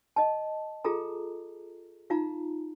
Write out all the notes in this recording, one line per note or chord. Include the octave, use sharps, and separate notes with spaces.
D#5 A5
F4 G#4 A4 A#5
D#4 F4 F5 A#5